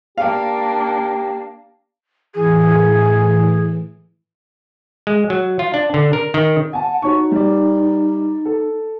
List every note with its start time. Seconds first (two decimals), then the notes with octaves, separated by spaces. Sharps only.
0.18 A#3 D4 G4 F5
2.34 A2 E3 G#4
5.07 G#3
5.30 F#3
5.59 F4
5.74 D4
5.94 D3
6.13 A#4
6.34 D#3
6.73 F#5 G#5 A5
7.02 D#4 F#4 C#5 C#6
7.32 G3 D5
8.45 A4